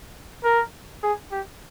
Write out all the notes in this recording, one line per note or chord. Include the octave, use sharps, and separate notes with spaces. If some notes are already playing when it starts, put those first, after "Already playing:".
A#4
G#4
G4